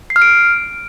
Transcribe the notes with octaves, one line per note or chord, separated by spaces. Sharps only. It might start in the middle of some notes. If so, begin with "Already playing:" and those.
C7
F6
D7